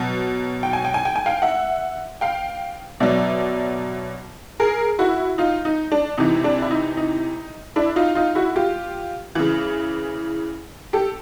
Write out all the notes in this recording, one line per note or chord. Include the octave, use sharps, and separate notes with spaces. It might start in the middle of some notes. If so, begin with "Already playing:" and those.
Already playing: B2 F#3
G5
G#5
G5
G#5
G5
G#5
F5 G5
E5 F#5
F5 G5
B2 F#3 D5 E5
G#4 A#4
E4 F#4
D#4 F4
D#4
D4
C3 E3 D#4
D4
E4
D#4
D#4
D4 E4
D#4 F4
D#4 F4
E4 F#4
F4 G4
C#3 E3
G4 A4